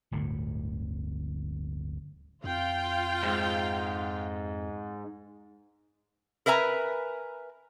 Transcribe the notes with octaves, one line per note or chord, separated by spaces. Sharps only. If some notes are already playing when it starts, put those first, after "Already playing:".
D1 G1 D2 A2
F2 F4 F5 G5
G#2
A#4 B4 E5 G#5 A#5